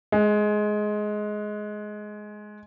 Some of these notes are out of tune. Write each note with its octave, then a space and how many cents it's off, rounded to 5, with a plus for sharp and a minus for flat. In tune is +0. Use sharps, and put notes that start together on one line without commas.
G#3 +15